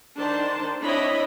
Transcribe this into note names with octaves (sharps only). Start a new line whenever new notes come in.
D#3 D4 C5 A5
C4 D4 E4 C#5 D#5 B5